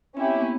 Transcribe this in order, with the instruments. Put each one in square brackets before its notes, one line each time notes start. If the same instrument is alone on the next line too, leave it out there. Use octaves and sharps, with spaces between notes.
[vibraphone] C4 [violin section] C#4 E4 G4
[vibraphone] B3
A#3
B3